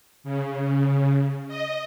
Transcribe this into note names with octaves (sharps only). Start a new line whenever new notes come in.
C#3
D#5